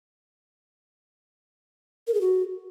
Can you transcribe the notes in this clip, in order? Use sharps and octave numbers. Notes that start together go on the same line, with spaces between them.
A#4
G#4
F#4